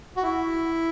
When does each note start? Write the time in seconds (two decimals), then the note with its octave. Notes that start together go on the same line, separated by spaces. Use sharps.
0.16 F#4
0.23 E4